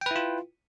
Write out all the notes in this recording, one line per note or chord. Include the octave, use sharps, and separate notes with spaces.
E4 F4 B4 G5